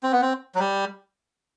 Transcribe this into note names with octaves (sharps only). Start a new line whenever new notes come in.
C4
B3
C4
F#3
G3